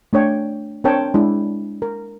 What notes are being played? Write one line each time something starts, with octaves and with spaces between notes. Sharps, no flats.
A3 D4 C#5 G5
C4 D4 A#4 C#5 G5 A5
G#3 D4 E4
A#4